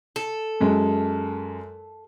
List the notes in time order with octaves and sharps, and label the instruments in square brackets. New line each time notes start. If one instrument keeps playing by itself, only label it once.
[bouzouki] A4
[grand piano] F#2 G#3